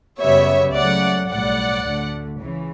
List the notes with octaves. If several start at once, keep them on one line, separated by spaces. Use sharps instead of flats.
F#2 C#3 G3 B3 C#5 E5
C#2 C#3 F#3 A3 D5 F#5
B1 A2 G3 D5 F#5
D2 D3 A3
C#2 C#3 E3